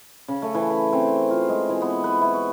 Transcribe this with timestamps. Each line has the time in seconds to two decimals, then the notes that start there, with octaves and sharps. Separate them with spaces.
0.28 C#3
0.42 A3
0.55 E3
0.70 B4
0.93 C4
1.31 F4
1.49 G#3
1.69 E3
1.82 B3
2.04 B4
2.21 E4
2.34 C#6